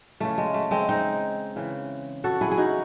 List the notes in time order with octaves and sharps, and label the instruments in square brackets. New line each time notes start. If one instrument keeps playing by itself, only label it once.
[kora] C#3 E3 A3
G#3
A3
G#3 C4
C4 D#4
C#3 E3
F#4 A4
E4 G#4
G#4
D#4 F#4